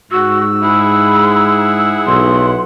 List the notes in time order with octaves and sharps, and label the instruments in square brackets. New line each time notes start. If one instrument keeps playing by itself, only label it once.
[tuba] G#2 [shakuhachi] F#4 [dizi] E6
[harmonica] E4 G#4 F#5 [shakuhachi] B5
[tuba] B1 [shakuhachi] C6